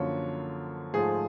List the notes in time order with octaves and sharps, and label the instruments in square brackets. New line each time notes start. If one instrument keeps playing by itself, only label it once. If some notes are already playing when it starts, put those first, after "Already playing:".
Already playing: [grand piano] F#2 D3 F3 A#3 C#5
G#2 F3 A3 G#4